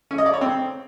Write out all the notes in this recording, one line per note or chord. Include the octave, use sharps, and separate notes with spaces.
C#4
D#5
D5
C#5
C4